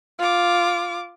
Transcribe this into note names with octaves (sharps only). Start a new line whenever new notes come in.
F4 D6